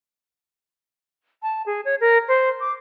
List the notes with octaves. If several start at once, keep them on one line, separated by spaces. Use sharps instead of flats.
A5
G#4
C#5
A#4
C5
D6